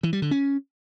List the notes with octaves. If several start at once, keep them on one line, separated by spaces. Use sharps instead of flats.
E3
G3
D3
C#4